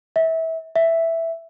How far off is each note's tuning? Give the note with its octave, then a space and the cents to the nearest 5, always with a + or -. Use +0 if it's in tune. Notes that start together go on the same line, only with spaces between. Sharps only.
E5 -25
E5 +0